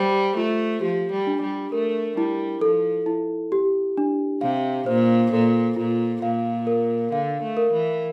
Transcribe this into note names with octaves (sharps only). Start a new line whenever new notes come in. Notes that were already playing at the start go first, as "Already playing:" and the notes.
Already playing: G3 C5
A3 F4
F3 G4
G3
D4
G3
A3 A#4
G3 E4
F3 A4
E4
G4
D4
C3 F5
A#2 C5
A#2 A4
A#2 F4
A#2 F5
A#4
D3 F5
A3
A#4
E3